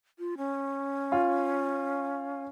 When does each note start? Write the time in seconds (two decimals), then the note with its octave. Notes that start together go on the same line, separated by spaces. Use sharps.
0.19 F4
0.38 C#4
1.12 F4